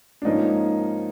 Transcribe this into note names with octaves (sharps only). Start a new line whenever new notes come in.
D4
G#2 F3 A#3 C#4 D#4